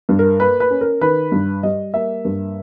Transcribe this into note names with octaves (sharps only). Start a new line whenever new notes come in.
G2
A#4
A#3 B4
B4
C#4
A#4
D#3 B4
G2
G3 D#5
A#3 E5
G2